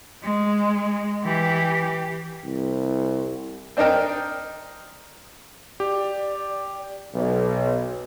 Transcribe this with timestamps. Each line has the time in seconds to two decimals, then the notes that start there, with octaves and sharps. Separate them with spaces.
0.23 G#3
1.24 E3 G4
2.44 C2
3.77 C4 D4 D#4 A#4 G5
5.80 G4 D5
7.14 B1